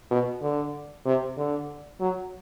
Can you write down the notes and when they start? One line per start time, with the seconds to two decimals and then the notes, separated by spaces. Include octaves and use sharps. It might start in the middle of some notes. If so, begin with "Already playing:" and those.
0.11 B2
0.42 D3
1.06 C3
1.37 D3
2.00 F#3